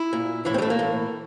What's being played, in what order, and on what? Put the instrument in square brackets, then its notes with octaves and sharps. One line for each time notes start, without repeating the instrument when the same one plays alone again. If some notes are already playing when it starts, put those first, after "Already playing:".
Already playing: [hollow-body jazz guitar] E4
A#2
A2 E3 E4
C4
G3
A3
A#3
A2 E3